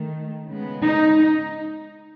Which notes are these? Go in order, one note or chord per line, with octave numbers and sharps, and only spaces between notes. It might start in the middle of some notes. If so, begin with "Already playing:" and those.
Already playing: D#3 A3
C#3 G#3 B3
D#4